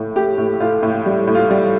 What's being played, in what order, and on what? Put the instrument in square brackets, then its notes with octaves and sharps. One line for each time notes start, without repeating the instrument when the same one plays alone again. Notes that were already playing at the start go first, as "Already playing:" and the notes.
Already playing: [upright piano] A2
A3 G4
A2
A2 F4
A2
G3
A2
F4
G3